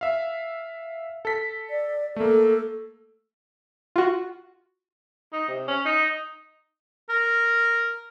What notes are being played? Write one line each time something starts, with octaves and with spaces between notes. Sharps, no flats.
E5 F5
A4 B6
D5
A3 A#3 A4
F4 F#4
D#4
C3
C#4
D#4
A#4